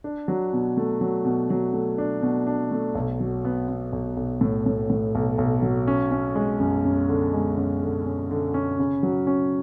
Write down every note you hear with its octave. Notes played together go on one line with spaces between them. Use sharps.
D4
F#3
B2
A3
F#3
B2
F#3
A3
D4
B2
D4
A3
B1
F#3
B3
B3
B1
B1
A2
A2
A2
B1
B1
F#3
C#4
C#4
G#3
F#2
F#2
D3
G#3
F#2
D3
C#4
D3
C#4
C#3
F#3
C#4